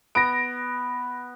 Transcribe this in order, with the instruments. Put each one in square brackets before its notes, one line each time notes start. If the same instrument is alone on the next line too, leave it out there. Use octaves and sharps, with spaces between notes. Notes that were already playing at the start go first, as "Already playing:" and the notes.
[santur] B3 [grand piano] A#6 D7